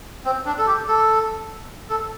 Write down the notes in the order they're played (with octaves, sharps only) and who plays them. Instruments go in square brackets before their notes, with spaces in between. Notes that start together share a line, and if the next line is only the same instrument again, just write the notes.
[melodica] C4
D4
A4
G4
A4
A4